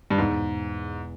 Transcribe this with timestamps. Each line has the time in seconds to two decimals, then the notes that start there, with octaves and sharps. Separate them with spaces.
0.10 G2
0.18 E2 G#2 B2 G#3